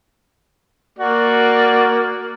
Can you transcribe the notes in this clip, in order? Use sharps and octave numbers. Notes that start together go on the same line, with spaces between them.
A#3 F#4 D5